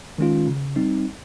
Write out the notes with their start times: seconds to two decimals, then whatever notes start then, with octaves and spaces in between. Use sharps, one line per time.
0.18 D#3 G#3 C#4 F4
0.47 C#3
0.76 G3 C4 D#4